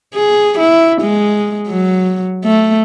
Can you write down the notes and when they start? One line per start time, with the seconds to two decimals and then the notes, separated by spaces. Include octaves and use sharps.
0.14 G#4
0.59 E4
1.02 G#3
1.68 F#3
2.45 A3